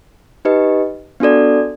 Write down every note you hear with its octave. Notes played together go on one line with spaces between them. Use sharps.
D#4 G4 B4 D#5
B3 D4 F#4 A4 D5